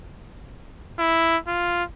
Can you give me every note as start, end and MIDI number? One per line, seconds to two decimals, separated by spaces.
0.99 1.37 64
1.48 1.84 65